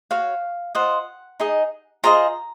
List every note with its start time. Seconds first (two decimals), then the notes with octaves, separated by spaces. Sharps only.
0.11 F#4 C#5 F5
0.75 F4 C5 D#5 F#5
1.40 D#4 G#4 D#5
2.04 F4 G#4 C5 D#5 A#5